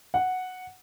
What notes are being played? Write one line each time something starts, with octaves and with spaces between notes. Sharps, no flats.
F#5